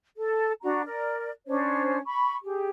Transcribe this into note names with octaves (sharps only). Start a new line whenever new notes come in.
A4
D4 F#4 A#5
A#4 D5
C#4 D4 C5 C#5
B5 C#6
G4 G#4